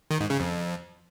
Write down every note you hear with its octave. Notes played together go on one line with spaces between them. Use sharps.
D#3
G#2
C#3
F2